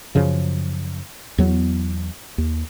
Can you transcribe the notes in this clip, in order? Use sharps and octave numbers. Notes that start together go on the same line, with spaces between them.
F#2 C#3 F3
E2 F#3 B3
D#2